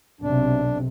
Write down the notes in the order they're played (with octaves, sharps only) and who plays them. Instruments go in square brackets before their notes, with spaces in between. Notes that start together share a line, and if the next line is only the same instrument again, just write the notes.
[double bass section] B1 C3 [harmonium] D4